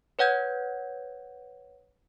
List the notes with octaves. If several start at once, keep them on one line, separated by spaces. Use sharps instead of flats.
B4 C#5 F#5 G6 G#6